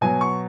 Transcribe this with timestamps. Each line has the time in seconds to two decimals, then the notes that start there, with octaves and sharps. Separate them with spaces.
0.01 B2 F#3 G#5
0.21 C#6